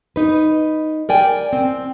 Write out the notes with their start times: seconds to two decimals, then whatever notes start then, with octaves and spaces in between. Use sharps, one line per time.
0.16 D#4 B4
1.09 A#4 D5 G5 G#5
1.53 C4